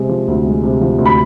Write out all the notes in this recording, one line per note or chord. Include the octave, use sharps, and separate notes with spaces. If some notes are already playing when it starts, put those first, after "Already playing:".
Already playing: C3 G#3
F3
D2
G#3
C3
F3
D2
B5